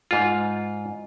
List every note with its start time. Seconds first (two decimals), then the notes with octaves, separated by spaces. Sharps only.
0.11 G#2 F4